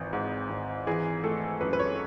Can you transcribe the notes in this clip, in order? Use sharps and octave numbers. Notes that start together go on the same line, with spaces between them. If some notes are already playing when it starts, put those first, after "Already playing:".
Already playing: G#1 E3
G#2
G#1
E3 G#4
A3 A4
F#2 B4
B4
C#5